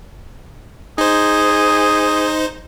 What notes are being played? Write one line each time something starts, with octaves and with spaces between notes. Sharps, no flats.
D#4 G#4 C5